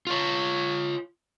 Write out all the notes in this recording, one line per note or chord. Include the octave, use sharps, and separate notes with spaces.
F4 C#5